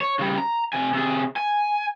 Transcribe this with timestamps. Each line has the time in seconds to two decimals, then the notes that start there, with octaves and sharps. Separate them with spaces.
0.01 C#5
0.19 C#3 G3
0.38 A#5
0.73 C3 G#5
0.93 C3 G#4
1.36 G#5